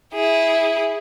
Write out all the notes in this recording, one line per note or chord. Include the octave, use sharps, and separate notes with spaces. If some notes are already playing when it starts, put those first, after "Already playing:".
E4 G#4